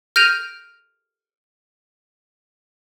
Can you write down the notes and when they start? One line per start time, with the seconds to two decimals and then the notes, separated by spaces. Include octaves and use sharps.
0.16 F6 G6 A#6 D7 D#7 F7